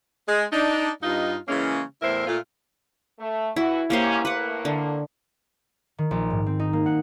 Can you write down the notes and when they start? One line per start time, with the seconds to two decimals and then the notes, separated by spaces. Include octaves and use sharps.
0.28 G#3
0.52 D4 D#4
1.03 G2 D#4 F4
1.48 C#3 E3 G#3 A#3 C#4
2.02 E2 A2 E4 A#4 C5 E5
2.27 A#2 A3 F4
3.20 A3
3.56 E3 E4 F#4
3.90 G#2 A#3 C#4 G4 C5
4.25 A2 A#3 B4 F#5
4.65 D3
5.98 D#3
6.11 A#1
6.30 G#2
6.46 C4
6.59 D#4
6.73 A#3
6.86 F#5